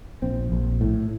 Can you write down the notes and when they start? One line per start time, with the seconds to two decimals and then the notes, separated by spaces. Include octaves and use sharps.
0.22 A#1 C4
0.52 A#1
0.81 A2